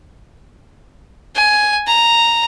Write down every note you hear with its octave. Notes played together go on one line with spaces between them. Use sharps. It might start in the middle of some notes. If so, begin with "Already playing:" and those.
G#5
A#5